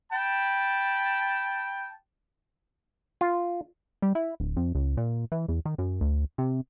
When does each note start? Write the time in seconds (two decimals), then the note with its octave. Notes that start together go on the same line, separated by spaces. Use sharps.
0.12 G5 A5 B5
3.21 F4
4.02 G3
4.15 E4
4.40 D1
4.57 F2
4.75 C#2
4.97 A#2
5.32 E3
5.48 E2
5.65 D#3
5.78 F#2
6.01 D2
6.38 C3